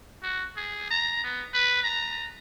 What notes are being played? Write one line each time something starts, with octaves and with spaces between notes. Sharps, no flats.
F#4
G#4
A#5
B3
B4
A#5